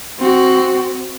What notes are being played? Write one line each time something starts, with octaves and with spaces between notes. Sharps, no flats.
C4 F#4